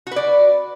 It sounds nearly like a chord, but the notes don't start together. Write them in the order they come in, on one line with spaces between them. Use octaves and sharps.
F#4 B4 D5